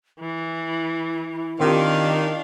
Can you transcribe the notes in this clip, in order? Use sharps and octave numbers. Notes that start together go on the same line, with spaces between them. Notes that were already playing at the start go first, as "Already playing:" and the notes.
E3 E4
D#3 C4 D4 F4 G4 F5